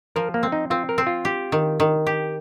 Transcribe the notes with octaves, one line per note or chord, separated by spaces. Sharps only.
F3 A#4
A#3
C4
D#4
C4 F4
A#4
C4
F4
G4
D#3
D#3
G4